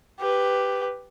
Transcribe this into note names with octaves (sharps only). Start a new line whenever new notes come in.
G4 B4